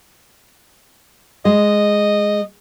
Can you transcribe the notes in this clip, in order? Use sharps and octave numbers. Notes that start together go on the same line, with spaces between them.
G#3 D#5